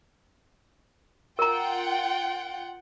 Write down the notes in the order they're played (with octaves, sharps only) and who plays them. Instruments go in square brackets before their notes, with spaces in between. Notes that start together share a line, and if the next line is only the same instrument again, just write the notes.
[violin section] F4 F#5 G5 [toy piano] A#4 A#5